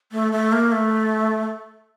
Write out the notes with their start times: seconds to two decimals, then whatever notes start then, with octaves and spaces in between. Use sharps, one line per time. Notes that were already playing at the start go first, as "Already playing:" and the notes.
0.12 A3
0.32 A3
0.52 A#3
0.72 A3